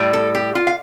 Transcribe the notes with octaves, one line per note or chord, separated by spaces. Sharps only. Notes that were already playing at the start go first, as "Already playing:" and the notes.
Already playing: A2 G3
A4
G4
F4
F5